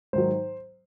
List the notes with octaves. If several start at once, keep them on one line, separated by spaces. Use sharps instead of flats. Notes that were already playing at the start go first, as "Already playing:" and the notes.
G#2 D#3 F#3 C5